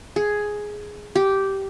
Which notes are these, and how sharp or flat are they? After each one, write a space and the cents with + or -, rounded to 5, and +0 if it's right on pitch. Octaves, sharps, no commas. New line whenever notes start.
G#4 +5
G4 -10